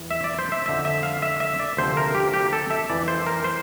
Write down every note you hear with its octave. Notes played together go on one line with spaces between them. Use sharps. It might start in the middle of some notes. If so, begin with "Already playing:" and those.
Already playing: E2 E3
E5
D5
C5
E5
F2 D3 F3 E5
E5
F5
E5
E5
D5
D2 C3 F3 C5
A#4
G4
G4
A4
E5
F2 E3 D5
C5
A#4
C5